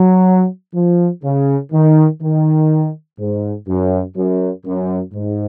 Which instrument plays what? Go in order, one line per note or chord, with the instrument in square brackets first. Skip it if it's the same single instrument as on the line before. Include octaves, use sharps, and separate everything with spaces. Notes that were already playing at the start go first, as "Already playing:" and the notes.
Already playing: [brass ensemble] F#3
F3
C#3
D#3
D#3
G#2
F#2
F#2
F#2
G#2